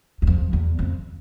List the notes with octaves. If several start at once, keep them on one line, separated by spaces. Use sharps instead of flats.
E2
F2
E2
F2